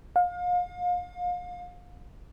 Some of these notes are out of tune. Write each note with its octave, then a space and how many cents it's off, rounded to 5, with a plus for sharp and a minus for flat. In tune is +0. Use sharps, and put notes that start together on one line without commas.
F5 +35